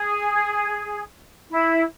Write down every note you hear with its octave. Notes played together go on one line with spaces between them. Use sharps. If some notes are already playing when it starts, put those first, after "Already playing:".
Already playing: G#4
E4